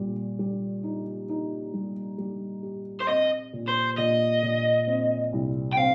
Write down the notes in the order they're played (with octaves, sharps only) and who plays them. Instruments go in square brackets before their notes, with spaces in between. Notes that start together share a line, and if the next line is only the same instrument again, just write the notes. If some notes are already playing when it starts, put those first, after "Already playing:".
Already playing: [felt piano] A#2 G3
G3
D#4
D#4
G3
G3
G4
[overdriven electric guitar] C5
[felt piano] C4 [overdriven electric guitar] D#5
[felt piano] A#2
[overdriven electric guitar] C5
[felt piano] A#2 [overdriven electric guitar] D#5
[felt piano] A#2
C4
C2
[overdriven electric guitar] G5
[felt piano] C4 [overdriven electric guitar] F5